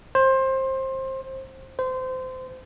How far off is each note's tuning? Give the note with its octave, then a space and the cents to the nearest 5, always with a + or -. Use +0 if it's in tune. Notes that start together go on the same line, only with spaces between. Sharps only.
C5 +20
C5 -25